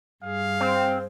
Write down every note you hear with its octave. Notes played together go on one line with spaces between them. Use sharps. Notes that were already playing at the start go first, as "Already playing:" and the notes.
G2 G#4 F5
C4 C5